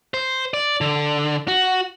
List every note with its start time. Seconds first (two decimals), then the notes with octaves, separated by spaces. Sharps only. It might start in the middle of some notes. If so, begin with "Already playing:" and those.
0.14 C5
0.54 D5
0.81 D3
1.48 F#4